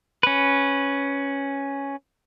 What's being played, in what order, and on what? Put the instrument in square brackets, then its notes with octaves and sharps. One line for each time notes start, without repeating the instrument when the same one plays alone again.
[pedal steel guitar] C#4 B4